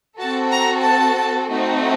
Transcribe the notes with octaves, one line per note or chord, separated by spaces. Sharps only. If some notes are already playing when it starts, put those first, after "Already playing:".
C4 F#4 A4 A5
A#5
A5
A3 C4 D#4 F#4